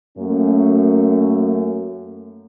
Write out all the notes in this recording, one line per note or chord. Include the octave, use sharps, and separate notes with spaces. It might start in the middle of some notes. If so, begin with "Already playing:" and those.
F#2 A3 A#3 C#4